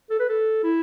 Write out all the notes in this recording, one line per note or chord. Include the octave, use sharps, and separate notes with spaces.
A4
B4
A4
E4